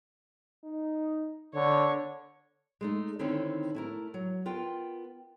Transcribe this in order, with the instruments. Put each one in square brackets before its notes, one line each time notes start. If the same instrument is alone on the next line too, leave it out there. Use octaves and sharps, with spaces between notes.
[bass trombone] D#4
[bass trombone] D3 [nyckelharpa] C#5
[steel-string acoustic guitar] G#3 A3 D#4
D3 D#3 C4 C#4 D#4 E4
A3 E4 A#4
F#3
B3 F4 A#4 G5